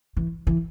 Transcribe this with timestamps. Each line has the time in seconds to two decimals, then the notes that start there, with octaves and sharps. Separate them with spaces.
0.17 E3
0.47 E3